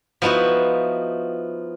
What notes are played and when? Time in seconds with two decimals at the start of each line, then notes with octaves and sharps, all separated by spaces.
0.22 F3 B3 D#4 E4 F#4